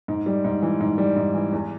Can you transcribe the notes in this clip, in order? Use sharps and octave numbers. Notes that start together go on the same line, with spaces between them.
G#2
G3
G#2
E3
G#2
G3
G#2
E3
E2